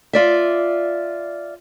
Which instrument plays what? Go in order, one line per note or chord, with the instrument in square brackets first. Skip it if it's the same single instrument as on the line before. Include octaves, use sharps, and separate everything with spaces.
[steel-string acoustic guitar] F4 D5 E5